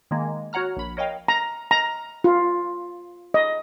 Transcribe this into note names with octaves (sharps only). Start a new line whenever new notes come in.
D#3 G#3 A#3
F#4 C#5 F#5 A#5 F6
A#1 B5
A#4 C#5 D#5 F5 G5
A#5
A#5
F4
D#5